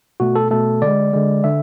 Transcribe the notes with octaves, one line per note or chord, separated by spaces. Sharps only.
B2 A3 F#4
A4
B2 A3 A4
D3 G#3 D5
D3 G#3
D3 E5